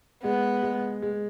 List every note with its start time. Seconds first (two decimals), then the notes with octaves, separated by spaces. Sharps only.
0.23 G#3 B3
0.63 G#3
1.02 G#3